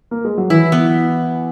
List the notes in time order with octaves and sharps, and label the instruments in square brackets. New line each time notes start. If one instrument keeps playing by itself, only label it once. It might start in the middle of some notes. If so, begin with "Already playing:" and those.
[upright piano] A#3
G#3
F#3
[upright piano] E3 [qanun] E4
[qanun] B3